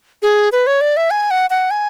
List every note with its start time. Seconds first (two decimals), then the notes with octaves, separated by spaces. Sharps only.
0.22 G#4
0.52 B4
0.67 C#5
0.81 D5
0.97 E5
1.11 G#5
1.31 F#5
1.50 F#5
1.71 G#5